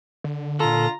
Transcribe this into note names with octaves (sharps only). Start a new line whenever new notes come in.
D3
A#2 F4 A4 A#5